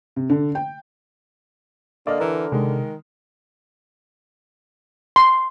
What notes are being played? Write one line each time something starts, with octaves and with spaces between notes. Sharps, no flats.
C3
D3
G5
D3 A#3 D5 D#5 F6
E3 A#4
C3 D#3 G#3
C6